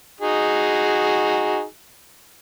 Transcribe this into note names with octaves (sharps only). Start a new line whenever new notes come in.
D#4 F#4 G#4